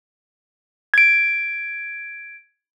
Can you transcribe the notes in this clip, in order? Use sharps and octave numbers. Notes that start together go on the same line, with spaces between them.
G#6 D7